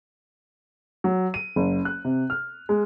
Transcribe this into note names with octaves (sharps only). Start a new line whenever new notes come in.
F#3
D#7
F#1
F#6
C3
F6
G#3